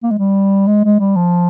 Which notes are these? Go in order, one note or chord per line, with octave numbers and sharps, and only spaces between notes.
A#3
G#3
G3
G#3
G#3
G3
F3